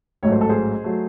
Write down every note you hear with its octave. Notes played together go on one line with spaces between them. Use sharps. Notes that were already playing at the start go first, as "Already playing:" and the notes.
A1 G#2 F#3 A3 C#5
C5
A4
G#4 C5
F#3 A3